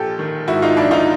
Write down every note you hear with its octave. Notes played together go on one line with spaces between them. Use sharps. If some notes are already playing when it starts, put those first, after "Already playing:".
Already playing: A#1 G4 A4
D#3
G#2 E4 F#4
D#4 F4
A#1 D4 E4
D#4 F4